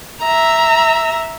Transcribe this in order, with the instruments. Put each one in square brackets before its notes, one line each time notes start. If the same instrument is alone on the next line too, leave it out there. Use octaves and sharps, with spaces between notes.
[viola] E5 A#5